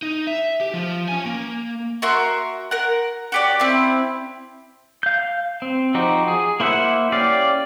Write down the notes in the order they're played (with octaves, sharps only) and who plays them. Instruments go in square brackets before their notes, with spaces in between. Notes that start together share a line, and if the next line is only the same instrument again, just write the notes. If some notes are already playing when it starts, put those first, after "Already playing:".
[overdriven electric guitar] D#4
E5
G4
F3 F4
C#4 G#5
A#3
[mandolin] F#4 A#4 E5 C6
A#4 F#5
F#4 G4 D5
C4 E4
[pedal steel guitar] F5 G6
C4
F3 D#4 F#4 G4 C5
G#4
A#3 E4 C5 E5 F#5
C#4 G4 D5 F5